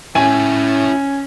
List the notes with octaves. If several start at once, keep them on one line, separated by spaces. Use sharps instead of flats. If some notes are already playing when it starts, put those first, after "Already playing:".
A2 C#4 E4 C#5 G#5